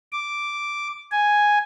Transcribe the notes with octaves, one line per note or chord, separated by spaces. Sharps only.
D6
G#5